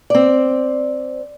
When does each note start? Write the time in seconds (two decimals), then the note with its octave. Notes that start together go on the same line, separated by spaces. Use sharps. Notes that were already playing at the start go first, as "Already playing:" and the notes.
0.10 C4 D5